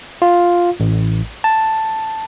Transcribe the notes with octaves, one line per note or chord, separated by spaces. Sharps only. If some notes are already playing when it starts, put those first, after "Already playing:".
F4
A1
A5